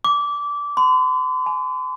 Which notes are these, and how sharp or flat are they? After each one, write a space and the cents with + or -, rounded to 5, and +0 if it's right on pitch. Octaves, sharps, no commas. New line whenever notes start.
D6 -20
C6 -45
G#5 +40